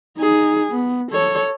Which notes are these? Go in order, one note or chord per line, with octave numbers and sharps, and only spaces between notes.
D#4 G#4
B3
A4 C#5